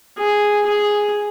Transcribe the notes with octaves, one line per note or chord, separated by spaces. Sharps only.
G#4
G#4